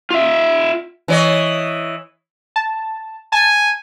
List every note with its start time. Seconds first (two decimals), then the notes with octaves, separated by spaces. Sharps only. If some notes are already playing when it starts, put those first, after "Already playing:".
0.11 F4 E5
1.08 E3 C#5 D#5
2.56 A5
3.32 G#5 A5